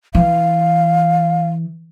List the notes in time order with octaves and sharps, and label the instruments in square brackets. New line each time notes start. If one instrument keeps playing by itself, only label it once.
[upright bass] E3 [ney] F5